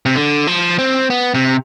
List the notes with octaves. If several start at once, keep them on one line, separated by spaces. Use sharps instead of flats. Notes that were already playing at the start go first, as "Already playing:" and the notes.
C3
D3
F3
C4
B3
C3